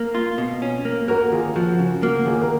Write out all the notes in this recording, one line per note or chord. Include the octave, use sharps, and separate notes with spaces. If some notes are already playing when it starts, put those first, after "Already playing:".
Already playing: A#3
F4
B2
C#4
A#3
A#3 F#4 A#4
D#2 F4 G#4
F3 F#4
C#3 F#4
A#3 F#4
D#2 F4 G#4
A#4